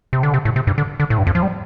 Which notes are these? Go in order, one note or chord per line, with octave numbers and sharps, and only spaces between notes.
C3
D3
C3
A2
C3
G2
D3
D3
A2
G2
F2
F3
G3